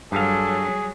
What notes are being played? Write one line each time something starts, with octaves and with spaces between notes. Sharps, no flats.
G2 F#3 G3 G#4 A4 F5